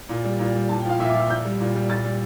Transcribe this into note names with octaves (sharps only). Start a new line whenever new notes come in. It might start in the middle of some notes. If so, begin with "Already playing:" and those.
A#2
G3
A#2
G3
A#2 A5
G5
F3 F5
A#2 E5
D6
F3
E6
A#2 G6
G3
A#2
G3
A#2 A6
G3